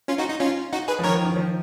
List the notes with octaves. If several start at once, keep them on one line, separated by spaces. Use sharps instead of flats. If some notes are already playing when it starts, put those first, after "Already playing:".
C#4 F4
D#4 F#4
D#4
C#4 F4
D#4 F#4
G#4 B4
F3
D#3 A#4 C#5
D#3
D#3
F3